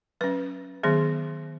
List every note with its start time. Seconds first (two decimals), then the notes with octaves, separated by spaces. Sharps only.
0.21 F#3 C#4 B4
0.83 D#3 F#3 B3 G#4